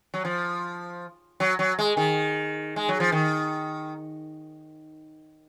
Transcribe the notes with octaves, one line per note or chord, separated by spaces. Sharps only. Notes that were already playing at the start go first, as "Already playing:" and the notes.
F#3
F3
F#3
F#3
G#3
D#3
G#3
F#3
F3
D#3